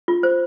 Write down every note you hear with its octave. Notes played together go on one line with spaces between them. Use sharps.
F4
C5